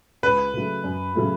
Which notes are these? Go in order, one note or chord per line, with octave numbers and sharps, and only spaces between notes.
C#2 B4
C#3 F#3 A3
F#2
C#3 F#3 A3